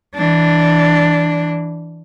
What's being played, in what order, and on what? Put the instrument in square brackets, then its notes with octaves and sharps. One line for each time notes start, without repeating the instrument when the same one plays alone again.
[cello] E3 D4